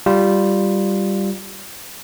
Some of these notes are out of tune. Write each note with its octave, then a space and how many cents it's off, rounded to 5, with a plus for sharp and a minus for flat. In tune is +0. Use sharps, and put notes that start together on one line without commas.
G3 +0 F4 +0